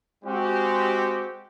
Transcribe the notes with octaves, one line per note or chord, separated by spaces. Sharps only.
G#3 C4 F#4 G4